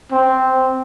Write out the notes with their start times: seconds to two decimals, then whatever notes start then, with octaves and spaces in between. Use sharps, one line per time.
0.12 C4